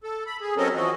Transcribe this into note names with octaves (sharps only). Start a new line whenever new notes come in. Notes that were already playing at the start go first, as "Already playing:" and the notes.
A4
B5
G#4
F#3 C4 C#4 A4 A#4 D#5
E3 F3 F#4 D#5